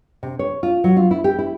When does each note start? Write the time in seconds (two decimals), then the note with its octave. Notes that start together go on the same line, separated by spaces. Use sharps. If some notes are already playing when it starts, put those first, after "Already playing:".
0.23 C3
0.39 C#5
0.63 F4
0.84 F#3
0.97 F4
1.11 E4
1.24 G4
1.39 E4